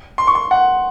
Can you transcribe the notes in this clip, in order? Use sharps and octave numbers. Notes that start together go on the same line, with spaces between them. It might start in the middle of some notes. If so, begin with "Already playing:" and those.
C6
C#6
C6
F#5